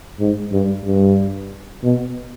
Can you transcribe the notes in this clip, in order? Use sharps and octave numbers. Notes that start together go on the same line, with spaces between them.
G#2
G2
G2
B2